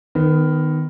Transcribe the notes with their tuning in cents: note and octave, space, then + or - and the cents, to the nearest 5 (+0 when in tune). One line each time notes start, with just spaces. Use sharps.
D#3 -5 B3 +20